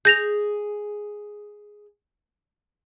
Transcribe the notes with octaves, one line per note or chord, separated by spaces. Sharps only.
G#4 G6 A#6 F7